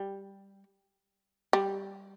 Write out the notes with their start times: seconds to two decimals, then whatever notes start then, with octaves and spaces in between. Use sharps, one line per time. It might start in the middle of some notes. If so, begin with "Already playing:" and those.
Already playing: G3
1.53 G3